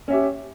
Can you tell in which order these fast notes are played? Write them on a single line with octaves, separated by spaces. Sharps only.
C#4 E5 G4